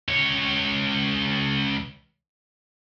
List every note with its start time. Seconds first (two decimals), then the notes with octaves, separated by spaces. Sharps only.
0.08 C#2 C#5